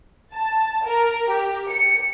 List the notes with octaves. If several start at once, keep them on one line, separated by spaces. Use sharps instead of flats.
A5
A#4
G4
C#7